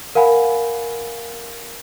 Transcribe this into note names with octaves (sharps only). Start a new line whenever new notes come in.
A#4 F5 F#5 G#5 B5